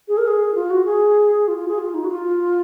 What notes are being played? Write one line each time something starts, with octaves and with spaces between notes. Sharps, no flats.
G#4
A#4
G#4
F4
F#4
G#4
F4
F4
G#4
F4
D#4
F#4
F4